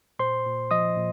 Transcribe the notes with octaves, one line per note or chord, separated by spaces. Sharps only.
A#2 C5 C6
A#2
F3 D#5 D#6
A#2